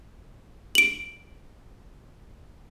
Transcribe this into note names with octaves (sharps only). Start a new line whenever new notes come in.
D7 F#7